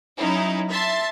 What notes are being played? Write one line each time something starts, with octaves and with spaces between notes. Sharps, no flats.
F#3 C#4 D#4 E4
E5 A5 C6